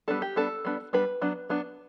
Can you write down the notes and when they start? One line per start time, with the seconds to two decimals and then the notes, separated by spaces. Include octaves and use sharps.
0.08 G3 B3 D4 A4
0.22 G4
0.36 G3 B3 D4 A4
0.65 G3 B3 D4
0.93 G3 B3 D4 B4
1.21 F#3 B3 D4
1.49 F#3 B3 D4